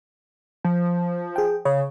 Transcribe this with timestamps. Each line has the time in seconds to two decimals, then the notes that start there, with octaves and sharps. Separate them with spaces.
0.64 F3
1.36 G#4 G5
1.65 C#3 C#5